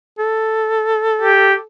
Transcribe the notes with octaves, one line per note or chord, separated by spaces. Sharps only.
A4
G4